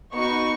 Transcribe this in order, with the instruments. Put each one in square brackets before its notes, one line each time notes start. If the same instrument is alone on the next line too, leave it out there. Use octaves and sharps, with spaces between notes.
[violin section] B3 D#4 F#4 C#6